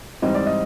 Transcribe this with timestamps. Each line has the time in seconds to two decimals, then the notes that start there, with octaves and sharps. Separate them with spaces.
0.22 G#2 E3 G3 C4 D#4 D#5
0.35 D5
0.46 D#5